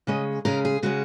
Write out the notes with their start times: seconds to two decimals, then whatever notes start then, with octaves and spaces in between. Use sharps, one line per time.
0.07 C#3 G#3 C#4 D#5
0.45 C#3 G#3 C#4 A#4
0.65 G#4
0.83 C#3 G#3 C#4 F#4